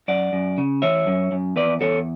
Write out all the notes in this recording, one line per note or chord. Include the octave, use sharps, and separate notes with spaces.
F#2 D5 F#5
F#2
C#3
E3 C#5 E5
F#2
F#2
E2 B4 D5
E2 A4 C#5